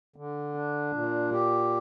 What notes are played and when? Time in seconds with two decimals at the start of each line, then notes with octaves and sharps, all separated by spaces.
0.16 D3
0.55 D4
0.93 A#2
1.32 G4